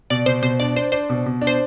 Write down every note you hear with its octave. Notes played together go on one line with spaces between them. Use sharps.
B2 D5
B2 C5
B2 C5
D4 D5
D4 C5
D4 C5
B2
B2
D4
C5